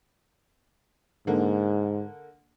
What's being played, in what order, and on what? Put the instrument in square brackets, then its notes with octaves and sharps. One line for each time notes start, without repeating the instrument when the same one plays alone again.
[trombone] G#2 [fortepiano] D3 A#3